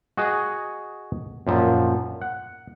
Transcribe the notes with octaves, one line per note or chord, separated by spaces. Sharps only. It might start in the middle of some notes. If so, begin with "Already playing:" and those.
F#4 G#4 D#5 F#5 G#5
F#2 A#2 F3
F#5